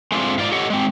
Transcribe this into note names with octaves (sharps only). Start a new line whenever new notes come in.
G#3 A3 C4 D4 E4 F4
G#2 F4 D5
G4 A4 C#5 D#5 F#5
G#3 C4